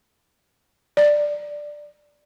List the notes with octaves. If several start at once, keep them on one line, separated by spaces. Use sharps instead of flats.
D5